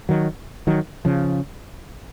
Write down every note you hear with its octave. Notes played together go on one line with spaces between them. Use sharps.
D#3 F#3
D#3 F#3
C#3 F3